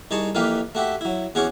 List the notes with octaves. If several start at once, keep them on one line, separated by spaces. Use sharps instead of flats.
C2 D#4 G#4 A5 A#5 C#6
F2 E3 A#3 G4 B4 F5
A3 F#4 G4 E5
F#3 E4
E2 C#4 F#4 G#4 C#6 D6